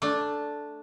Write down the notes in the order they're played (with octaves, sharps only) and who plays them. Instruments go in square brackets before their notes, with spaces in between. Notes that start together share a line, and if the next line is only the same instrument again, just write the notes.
[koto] A3 D4